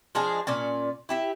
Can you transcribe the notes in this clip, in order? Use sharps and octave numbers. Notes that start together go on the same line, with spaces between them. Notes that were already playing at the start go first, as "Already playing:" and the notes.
F3 G#3 D4 G#4
A#2 C#4 D5
E4 G4 E5